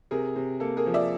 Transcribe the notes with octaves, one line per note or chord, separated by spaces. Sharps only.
C3 G#4 A#4
C3
A#3 A4
G#4 A#4
F3
D5 E5